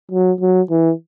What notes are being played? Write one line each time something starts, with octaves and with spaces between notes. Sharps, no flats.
F#3
F#3
E3